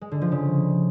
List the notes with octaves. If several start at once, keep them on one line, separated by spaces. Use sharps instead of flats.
G#3
D3
F3
C#3